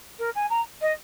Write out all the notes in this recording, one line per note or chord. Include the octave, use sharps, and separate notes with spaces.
A#4
G#5
A#5
D#5